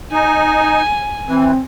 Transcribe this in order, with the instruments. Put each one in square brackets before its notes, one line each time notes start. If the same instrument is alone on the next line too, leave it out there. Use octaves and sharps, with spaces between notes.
[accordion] D#4 [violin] G#5
[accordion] E3 [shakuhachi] C4